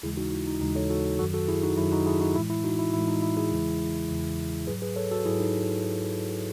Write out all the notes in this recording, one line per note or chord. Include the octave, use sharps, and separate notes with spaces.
D#2 C#3 E3 G#3 E4 G#4
D#4 F#4
E4
D#4
D#2 C#3 E3 G#3 D#4
A4 C#5
F#4 A4
F#2 D#3 F#3 F#4 A4
F#4 A4
E4 G#4
D#4 F#4
F#2 D#3 F#3 E4
D#4 F#4
E4 G#4
D#4 F#4
A2 E3 G#3 E4
E4
D#4 F#4
E4
A2 E3 G#3 E4
D#4
E4
E4 G#4
E2 C#3 E3 G#3
E2 C#3 E3 G#3
G#2 F#3 G#4 B4
G#4 B4
A4 C#5
F#4 A4
G#2 F#3 E4 G#4
D#4